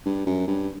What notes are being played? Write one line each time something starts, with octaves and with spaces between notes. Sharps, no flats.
G2
F#2
G2